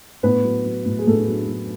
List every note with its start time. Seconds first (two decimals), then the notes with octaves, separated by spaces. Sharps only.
0.23 A2 B3 B4
0.45 F#3
0.65 F#3
0.85 A2
0.99 G#4
1.06 A2 A3 A4
1.28 F#3
1.48 F#3